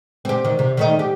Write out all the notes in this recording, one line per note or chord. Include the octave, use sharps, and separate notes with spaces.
C4 G4
D#3
C3
D#3 A3 D#4
G4